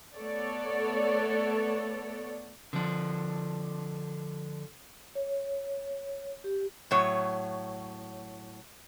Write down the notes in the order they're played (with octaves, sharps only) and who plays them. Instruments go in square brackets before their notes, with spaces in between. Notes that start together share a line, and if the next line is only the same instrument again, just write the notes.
[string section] A3 B3 A4 C#5 D5
[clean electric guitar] D3 F3 D4
[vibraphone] C#5
G4
[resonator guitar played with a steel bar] A2 F#3 C#5